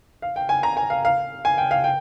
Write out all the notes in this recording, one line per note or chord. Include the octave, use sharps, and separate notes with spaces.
F5
G5
G#5
A#5
G#5
F5
F5
G#5
G5
F5
G5